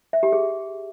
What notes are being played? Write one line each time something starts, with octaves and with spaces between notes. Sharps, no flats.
E5
G4
G#4